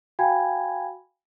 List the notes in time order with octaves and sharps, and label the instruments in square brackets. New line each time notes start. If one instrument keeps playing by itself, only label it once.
[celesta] F#4 F5 G5 G#5 B5 G#6